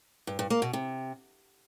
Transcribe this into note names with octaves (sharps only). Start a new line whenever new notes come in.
G2
G2
A#3
B2
C3